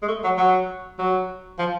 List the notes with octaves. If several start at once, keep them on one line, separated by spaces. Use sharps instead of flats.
G#3
A3
F#3
F#3
F#3
F3